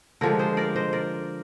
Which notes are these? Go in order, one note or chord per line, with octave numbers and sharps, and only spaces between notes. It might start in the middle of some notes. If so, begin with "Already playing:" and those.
D3 F3 G#3 G4 A#4
G#4 C5
A#4 D5
C5 D#5
A#4 D5